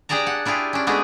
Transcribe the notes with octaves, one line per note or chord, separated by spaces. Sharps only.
D4 G4 G#4 D5 A5 A#5
F#5
D4 E4 F4 G4 G#4
C#4 D4
G#3 A3 B3 D4 F#4 G#4